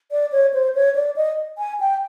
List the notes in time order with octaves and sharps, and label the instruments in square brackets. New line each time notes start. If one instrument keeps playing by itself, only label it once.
[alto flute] D5
C#5
C5
C#5
D5
D#5
G#5
G5